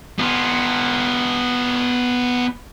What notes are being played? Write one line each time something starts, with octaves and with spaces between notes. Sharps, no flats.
B3 F4